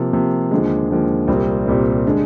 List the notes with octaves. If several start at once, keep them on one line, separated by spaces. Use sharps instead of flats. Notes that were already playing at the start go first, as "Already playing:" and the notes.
Already playing: C3 F3 A#3
C3 F3 A#3
D#2 D3 F3 G#3
D#2 D3 F3 G#3
C2 A#2 G3 C4
C2 A#2 G3 C4
D3 G#3 D4